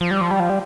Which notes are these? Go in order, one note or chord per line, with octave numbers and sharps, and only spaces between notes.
F3
G3
F3
G3
F3
G3